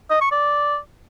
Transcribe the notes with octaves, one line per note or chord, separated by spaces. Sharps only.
D#5
C#6
D5